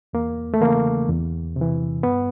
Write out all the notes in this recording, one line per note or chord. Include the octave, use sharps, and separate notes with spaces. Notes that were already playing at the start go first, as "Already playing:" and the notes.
E2 A#3
A3
C#3 E3 A#3
E2
C3
E3
G2 B3